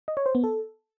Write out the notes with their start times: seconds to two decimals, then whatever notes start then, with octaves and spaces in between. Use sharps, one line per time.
0.08 D#5
0.17 C#5
0.26 C5
0.35 B3
0.44 A4